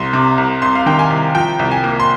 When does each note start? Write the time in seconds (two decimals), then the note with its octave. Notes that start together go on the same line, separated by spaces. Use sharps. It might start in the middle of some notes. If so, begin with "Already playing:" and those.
Already playing: C2 C6
0.13 C3
0.38 C2
0.62 C2 C6
0.75 F5
0.86 D#3 G5
0.99 G#5
1.11 C2
1.35 F3 G5
1.59 C2
1.71 G#5
1.84 A#3
2.00 C6